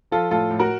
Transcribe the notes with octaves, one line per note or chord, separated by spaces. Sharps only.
F3 F4 A4
A2 F4 A4
A2
F#4 A#4